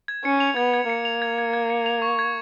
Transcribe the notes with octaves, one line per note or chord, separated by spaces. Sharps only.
G#6
C#4 C#7
F7
B3 G#6
G#6
A#3 C#7
F7
G#6
G#6
G#6
C#7
F7
C#6
G#6